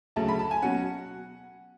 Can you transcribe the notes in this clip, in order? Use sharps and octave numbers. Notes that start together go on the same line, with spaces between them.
D2 C#3 F#3 A3 A5
B5
A5
G#5
B2 F#3 C#4 F#5